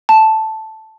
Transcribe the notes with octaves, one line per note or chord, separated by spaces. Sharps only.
A5